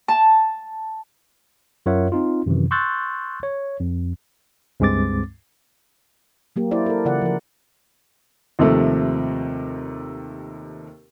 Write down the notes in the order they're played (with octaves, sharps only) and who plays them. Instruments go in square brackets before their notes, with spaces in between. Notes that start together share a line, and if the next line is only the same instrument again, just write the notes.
[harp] A5
[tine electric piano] F#2 F4 A#4 C#5 E5 F#5
C4 D#4 F4
F#2 C3 D#3 E3
C6 C#6 E6 F#6 G6 A6
C#5
F2
[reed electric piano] C#2 G2 G#3 C4 D6 A6
[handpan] F#3 A#3 G4
E4 A#4 C5 D5
A4 A#4
C#3 E3 F4 D5 F#5
F3 A#4
[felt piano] D#2 C3 F3 A3